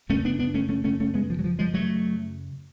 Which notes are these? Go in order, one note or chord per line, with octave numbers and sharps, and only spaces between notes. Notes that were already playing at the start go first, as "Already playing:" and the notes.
F#2 C#3 A3 C#4
B3 D4
B3 D4
A3 C#4
A3 C#4
A3 C#4
A3 C#4
G#3 B3
F3
F#3
F3
F3 G#3
F#3 A3